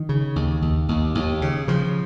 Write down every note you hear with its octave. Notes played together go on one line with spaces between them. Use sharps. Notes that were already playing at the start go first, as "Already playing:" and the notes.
Already playing: D#3
C#3
D#2
D#2
D#2
D#2
C#3
C#3 F3